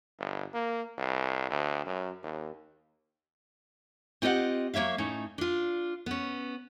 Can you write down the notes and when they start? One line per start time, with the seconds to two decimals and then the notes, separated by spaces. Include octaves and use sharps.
0.19 G1
0.54 A#3
0.98 C2
1.50 D2
1.86 F#2
2.23 D#2
4.22 C4 F4 G4 D#5 F#5
4.74 F#3 A#3 C#5 E5 F5
4.98 A2 C#4 D#4
5.38 D4 F4
6.06 B3 C#4